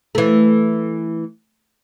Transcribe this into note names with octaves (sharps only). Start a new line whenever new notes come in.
E3 A3